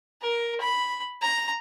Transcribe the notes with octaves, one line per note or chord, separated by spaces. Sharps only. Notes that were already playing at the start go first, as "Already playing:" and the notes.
A#4
B5
A#5